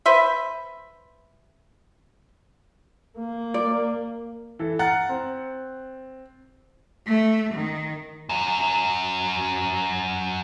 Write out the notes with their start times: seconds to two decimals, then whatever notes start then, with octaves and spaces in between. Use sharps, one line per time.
0.06 B4 C5 E5
3.19 A#3
3.54 D5
4.59 E3 A4
4.79 F#5 A#5 F6 F#6 A6
5.09 C4
7.07 A3
7.54 D#3
8.29 F#2 F#3